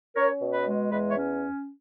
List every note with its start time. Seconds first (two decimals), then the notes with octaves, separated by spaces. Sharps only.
0.15 C#4 A#4 C#5
0.41 B2
0.53 B4 D#5
0.66 G#3
0.91 E2 B4 D#5
1.10 C#5 E5
1.16 C#4